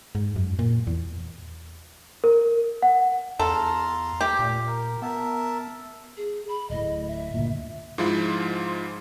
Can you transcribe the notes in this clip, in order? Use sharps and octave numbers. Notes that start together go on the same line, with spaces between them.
G#2
F#2
A#2
E2
A#4
F#5
E2 A4 F5 A#5 C6
A3 G4
A#2
A#4
B3 A#4 E5 A5
G#4
B5
D1 A2 D#5
E5
D2 G2 A#2
G#2 F3 G#3 E4 F4 B5